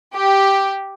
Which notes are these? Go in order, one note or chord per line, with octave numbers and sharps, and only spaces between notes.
G4